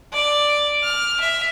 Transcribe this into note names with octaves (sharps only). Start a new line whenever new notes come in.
D5
F6
E5